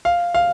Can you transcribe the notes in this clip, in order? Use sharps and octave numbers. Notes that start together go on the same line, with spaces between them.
F5
F5